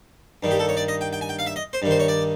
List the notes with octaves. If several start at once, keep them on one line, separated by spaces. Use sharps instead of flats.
G2 D#3
G4
A4
C#5
D5
D#5
G5
G5
G#5
G5
F5
E5
D#5
C5
G2 D#3
C5
C#5
D5